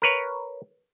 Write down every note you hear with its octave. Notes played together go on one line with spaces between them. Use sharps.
A#4 B4 C#5